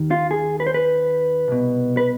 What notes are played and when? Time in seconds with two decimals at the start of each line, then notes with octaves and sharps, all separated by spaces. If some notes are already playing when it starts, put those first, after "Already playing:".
Already playing: D#2 D#3
0.11 F4
0.31 G#4
0.60 B4
0.67 C5
0.74 B4
1.48 C2 B2
1.97 B4